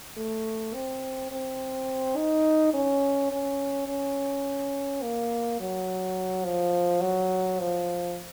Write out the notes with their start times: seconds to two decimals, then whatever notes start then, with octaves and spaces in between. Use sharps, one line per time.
0.17 A3
0.74 C4
1.31 C4
2.16 D#4
2.74 C#4
3.31 C#4
3.88 C#4
5.02 A#3
5.60 F#3
6.45 F3
7.01 F#3
7.59 F3